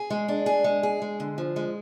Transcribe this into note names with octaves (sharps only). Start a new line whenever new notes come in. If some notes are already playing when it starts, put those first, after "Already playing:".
Already playing: G#4
G#3
D4
G#4
G#3
G#4
G#3
D3
F3
G#3